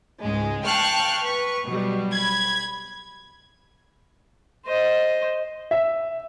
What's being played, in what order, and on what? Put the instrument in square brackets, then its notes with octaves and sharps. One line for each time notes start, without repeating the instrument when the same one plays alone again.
[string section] C#2 G#2 G#3
F5 G5 A5 C#6 F6 F#6
B4 C#6
B2 F#3 G3
B5 G#6
[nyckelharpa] C5 D#5
[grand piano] E5